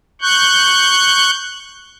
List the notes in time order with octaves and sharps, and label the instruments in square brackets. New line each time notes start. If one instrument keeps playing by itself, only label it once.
[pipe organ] C#6 F#6 G6